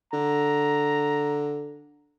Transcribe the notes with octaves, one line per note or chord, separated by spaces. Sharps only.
D3 A#5